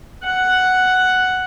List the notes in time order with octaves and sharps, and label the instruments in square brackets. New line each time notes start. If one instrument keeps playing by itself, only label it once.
[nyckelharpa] F#5